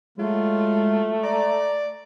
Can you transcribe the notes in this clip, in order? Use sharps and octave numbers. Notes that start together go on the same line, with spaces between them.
F#3 G#3 A3 F4
D5 A#5